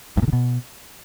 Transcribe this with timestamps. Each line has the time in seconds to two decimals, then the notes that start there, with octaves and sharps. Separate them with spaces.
0.17 G2
0.22 A#2
0.28 D3
0.33 B2